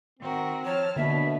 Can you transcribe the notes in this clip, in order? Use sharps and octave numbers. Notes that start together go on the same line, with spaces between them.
D#3 C4 F#4 A#4
F3 C#5 A5 F6
B2 D3 A#3 B3 D4 B4 E5